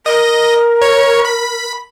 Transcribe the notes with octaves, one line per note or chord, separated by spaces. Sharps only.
A#4 D#5
C#5
B5